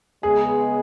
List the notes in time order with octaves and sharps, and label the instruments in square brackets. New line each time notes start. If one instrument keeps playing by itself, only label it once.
[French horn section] C#3 G#3 B3 [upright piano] G#4